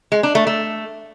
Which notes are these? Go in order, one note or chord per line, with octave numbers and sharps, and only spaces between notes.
G#3
D4
A3
A3